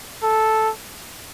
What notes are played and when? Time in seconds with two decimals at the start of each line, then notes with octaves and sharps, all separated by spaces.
0.22 A4